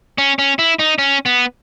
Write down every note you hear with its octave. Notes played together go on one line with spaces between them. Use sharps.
C#4
C#4
E4
D#4
C#4
B3